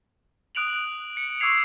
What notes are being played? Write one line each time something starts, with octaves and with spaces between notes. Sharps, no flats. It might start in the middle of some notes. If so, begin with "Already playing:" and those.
D#6 F#6 D7 F7 F#7
C#7
C#6 D6 E6 G#6 C7 F7